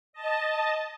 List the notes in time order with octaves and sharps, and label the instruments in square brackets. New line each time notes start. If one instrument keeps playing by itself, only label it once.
[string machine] D#5 A5